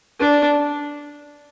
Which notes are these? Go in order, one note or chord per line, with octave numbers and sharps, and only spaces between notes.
D4